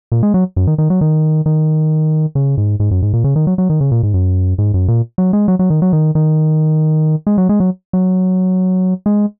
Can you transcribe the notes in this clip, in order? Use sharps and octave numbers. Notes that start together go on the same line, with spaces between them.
A#2
G#3
F#3
F#2
D#3
D#3
F#3
D#3
D#3
C#3
G#2
G#2
F#2
G#2
A#2
C#3
D#3
F#3
F#3
D#3
C#3
A#2
G#2
F#2
G#2
F#2
A#2
F#3
G#3
F#3
F#3
D#3
F#3
D#3
D#3
G#3
F#3
G#3
F#3
F#3
G#3